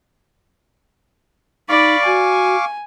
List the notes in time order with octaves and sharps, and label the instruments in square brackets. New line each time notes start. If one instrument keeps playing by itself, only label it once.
[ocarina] D#4 [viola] D5 B5 [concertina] F5 C#6 D6
[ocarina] F#4 [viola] G#5